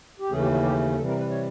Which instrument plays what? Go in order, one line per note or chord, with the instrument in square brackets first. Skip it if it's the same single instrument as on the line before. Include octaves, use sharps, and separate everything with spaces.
[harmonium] G4
D#2 C#3 E3 A3 C#4 G#4
G4
F#4
G4
C3 E3 G3 A4
A#4
B4
C#5